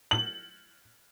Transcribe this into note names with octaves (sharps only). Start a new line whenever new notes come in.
F#7